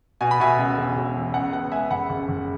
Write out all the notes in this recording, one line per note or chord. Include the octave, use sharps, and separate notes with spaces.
B2 G#5
B5
B2 E5 G#5
C#2
E1
E1
E2
C#2 F#5
B3 F#5
G#3 E5 G#5
F#1 F#5 B5
F#1
F#1